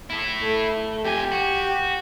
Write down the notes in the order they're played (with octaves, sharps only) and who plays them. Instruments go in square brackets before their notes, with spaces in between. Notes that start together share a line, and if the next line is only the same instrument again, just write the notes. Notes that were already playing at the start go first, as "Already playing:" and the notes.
[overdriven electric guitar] E4 A4
[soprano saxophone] A3
[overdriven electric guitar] F2 G#5 [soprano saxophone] G4
[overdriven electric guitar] F#4